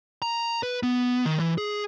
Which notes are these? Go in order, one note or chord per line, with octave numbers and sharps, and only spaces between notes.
A#5
B4
B3
D#3
E3
G#4